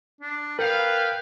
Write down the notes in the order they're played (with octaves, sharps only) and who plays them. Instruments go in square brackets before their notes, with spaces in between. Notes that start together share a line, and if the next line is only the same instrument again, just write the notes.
[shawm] D4
[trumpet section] B3 B4 F5 [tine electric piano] A#4 [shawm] G5